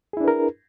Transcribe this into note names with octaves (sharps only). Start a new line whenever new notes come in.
D4 E4 G#4 A#4 B4